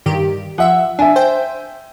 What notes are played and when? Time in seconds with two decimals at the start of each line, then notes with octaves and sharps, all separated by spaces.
0.06 G2 D#3 G4
0.58 F3 E5 F#5
0.99 D4 E5 G#5
1.16 C5 G5